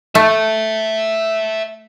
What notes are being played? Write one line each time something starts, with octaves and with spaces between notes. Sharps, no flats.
A3 E5 A5